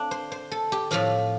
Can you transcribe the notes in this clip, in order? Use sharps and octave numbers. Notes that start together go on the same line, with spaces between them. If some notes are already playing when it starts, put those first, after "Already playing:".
Already playing: A3 C4 D4 F4
C5
C5
A4
G4
A2 F3 C4 F4